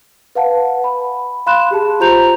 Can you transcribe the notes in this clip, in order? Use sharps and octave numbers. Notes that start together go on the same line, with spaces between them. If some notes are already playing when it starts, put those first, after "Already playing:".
B4 F5 F#5 A5
B5
F5 B5 C6 F#6 E7
G4 G#4 A5
F4 G4 C5 A#5 G6 F7